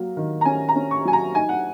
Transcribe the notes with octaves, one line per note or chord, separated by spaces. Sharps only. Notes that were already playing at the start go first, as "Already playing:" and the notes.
Already playing: F#3 A#3
D#3
A#5
C#4 G#5
A#5
C#4
C#6
F#3 G#5
A#5
D#4 G#5
F#5